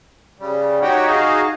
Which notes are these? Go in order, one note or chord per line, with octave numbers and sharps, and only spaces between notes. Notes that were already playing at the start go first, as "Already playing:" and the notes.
C#3 G3
D#4 F#4 G4 C#5 F#5 G5
D#4 F#4 G#4 D#5 F5